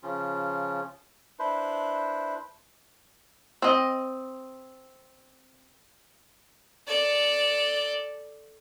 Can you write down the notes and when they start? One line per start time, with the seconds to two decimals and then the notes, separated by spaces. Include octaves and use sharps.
0.03 C#3 F3 C#4 F4
1.39 D4 E4 B4 C5
3.62 C4 D#5
6.88 A4 D5